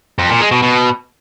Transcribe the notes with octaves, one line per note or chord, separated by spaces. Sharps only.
F2
A#2
G#3
B2
B2